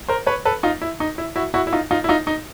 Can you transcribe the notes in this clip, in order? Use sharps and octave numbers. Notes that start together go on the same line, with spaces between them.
A#4 C5
B4 C#5
A4 B4
D#4 F4
E4
D#4
E4
E4 F#4
E4 F#4
E4
D#4 F4
D#4 F4
E4
D#4 F4
D#4